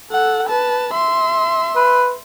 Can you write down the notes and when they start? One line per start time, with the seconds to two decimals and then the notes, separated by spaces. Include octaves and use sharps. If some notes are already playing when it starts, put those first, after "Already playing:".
0.11 A4 F#5
0.48 B4 A5
0.94 E5 C6
1.76 B4